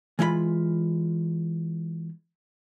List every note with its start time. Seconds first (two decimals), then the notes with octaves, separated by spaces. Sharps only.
0.19 E3 G#3 F4 E5 B5